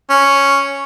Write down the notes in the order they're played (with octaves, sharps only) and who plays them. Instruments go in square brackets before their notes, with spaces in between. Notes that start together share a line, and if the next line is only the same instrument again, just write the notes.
[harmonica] C#4